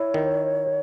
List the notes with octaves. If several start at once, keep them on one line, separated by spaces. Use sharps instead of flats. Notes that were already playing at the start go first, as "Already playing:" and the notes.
Already playing: E4 C#5
D#3